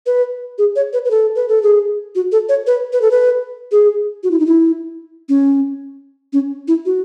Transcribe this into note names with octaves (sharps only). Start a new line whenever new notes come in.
B4
G#4
C#5
B4
B4
A4
B4
A4
G#4
F#4
A4
C#5
B4
B4
A4
B4
G#4
F#4
E4
D#4
E4
C#4
C#4
E4
F#4